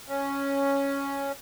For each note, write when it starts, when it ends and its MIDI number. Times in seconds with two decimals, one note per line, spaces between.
0.09 1.32 61